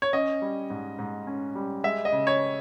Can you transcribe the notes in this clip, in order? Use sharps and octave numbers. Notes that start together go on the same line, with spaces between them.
C#5
C#4 D#5
G3
G#2
G#2
C#4
G3
G#3 E5
D#5
C#3
C#5